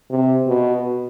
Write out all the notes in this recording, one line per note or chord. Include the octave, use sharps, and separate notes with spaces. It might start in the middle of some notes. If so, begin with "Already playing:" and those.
C3
B2